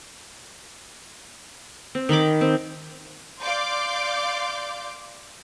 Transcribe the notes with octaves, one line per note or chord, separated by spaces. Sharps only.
C4
D#3 D#4 B5 D6
C4
D5 F5 C6 D6 G6